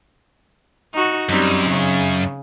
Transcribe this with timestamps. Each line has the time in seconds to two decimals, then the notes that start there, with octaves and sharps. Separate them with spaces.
0.94 D#4 F#4
1.29 F#2 G3 C4 D#4
1.70 C#3